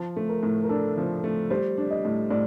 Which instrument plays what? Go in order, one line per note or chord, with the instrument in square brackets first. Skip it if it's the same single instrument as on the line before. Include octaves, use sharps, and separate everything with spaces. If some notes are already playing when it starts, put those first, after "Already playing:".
Already playing: [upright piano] F3 [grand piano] A5
[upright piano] A3
[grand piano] A#4
[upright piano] A2
[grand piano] A#4
[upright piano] D4 [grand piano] A4
[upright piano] F3
A3
[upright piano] G3 [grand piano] C5
[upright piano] D4
[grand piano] D#5
[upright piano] A2
[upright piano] A2 [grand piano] D5